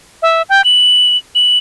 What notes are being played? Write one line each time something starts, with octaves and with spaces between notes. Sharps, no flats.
E5
G5
F#7
F#7